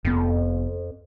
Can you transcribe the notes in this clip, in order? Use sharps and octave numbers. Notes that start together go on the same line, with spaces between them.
F1 F2 B3